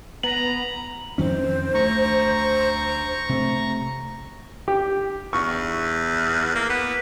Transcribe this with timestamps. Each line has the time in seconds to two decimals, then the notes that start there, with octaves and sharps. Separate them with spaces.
0.23 B3 A#5 F#7
1.18 F2 D#3 C#4 C5
1.74 D2 A3 A#5 C#6
3.29 C3 A3
4.68 G4
5.33 E2 C#6
6.56 A#3
6.69 B3